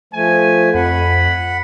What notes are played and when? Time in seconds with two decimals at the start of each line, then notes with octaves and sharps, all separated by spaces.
0.14 F3 A3 G#5
0.74 F2 F#5 B5